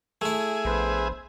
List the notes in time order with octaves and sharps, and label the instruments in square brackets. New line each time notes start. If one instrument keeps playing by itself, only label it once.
[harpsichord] A3 E4 [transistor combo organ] G#4 E5 G#5
[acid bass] A#1 [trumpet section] B3 B4 C5